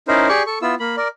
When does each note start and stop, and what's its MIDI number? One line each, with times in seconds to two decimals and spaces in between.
0.08 0.28 61
0.08 0.28 63
0.08 0.28 64
0.08 0.28 70
0.08 0.28 72
0.29 0.43 67
0.29 0.43 68
0.29 0.43 74
0.29 0.43 85
0.47 0.59 69
0.47 0.59 85
0.62 0.75 59
0.62 0.75 64
0.62 0.75 65
0.62 0.75 88
0.80 0.96 58
0.80 0.96 83
0.97 1.08 70
0.97 1.08 74